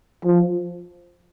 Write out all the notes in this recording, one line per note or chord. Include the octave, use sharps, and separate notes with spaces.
F3